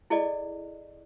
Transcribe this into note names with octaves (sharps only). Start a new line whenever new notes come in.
E4 G#4 A4 D5 D#5